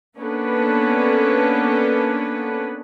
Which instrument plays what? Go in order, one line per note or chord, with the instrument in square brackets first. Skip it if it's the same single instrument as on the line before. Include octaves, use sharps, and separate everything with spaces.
[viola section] A#3 B3 C#4 D4 A4 B4